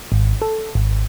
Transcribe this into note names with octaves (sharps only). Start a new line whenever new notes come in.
G#1
A4
G#1